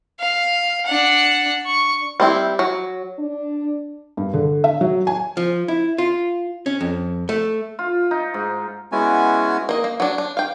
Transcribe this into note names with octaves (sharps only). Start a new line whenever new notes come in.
F5
D4 F#5
C#6
G3 C4 E4
F#3
D4
G2
D3
E5
F#3
G#5
F3
E4
F4
C#4
F2
A3
F4
D#4
G#2
G#3 B3 C#4 E4 F#4 G#5
A#3 D#5
A#3
F#3 D4
D4
F5 G5